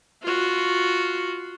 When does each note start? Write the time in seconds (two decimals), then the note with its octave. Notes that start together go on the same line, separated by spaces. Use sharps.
0.22 F4 F#4